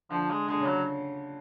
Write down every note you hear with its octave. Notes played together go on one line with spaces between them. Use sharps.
D3 F3
G#3
D3 G#3
C#3
F#3